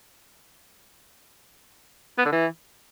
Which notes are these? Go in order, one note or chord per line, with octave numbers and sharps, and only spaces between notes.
B3
D3
E3